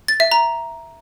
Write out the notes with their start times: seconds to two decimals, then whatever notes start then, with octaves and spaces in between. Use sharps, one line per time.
0.08 A6
0.20 E5
0.31 A#5